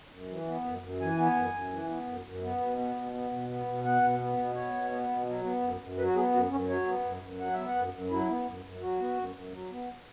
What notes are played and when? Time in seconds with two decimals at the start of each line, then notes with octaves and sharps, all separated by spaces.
0.12 F#2
0.29 E3
0.47 B3
0.65 F#2
0.82 F#2
1.00 E3 G#5
1.18 B3
1.36 F#2
1.53 F#2
1.72 E3
1.89 B3
2.07 F#2
2.25 F#2
2.43 B3
2.60 B2
2.77 B3
2.95 B2
3.14 B3
3.32 B2
3.49 B3
3.66 B2
3.84 B3 F#5
4.02 B2
4.20 B3
4.37 B2
4.55 B3 C#5
4.74 B2
4.91 B3
5.09 B2
5.27 F#3
5.44 B3
5.62 F#2
5.80 F#2
5.98 F#3 B4
6.06 F#4
6.15 B3 G#4
6.33 F#2 F#4
6.51 F#2 C#4
6.69 F#3 C#5
6.86 B3
7.04 F#2
7.22 F#2
7.39 F#3 F#5
7.53 B3 E5
7.68 F#5
7.75 F#2
7.93 F#2
8.11 F#3 E4
8.29 B3
8.47 F#2
8.64 F#2
8.81 F#3 F#4
8.99 B3
9.17 F#2
9.35 F#2
9.53 F#3
9.71 B3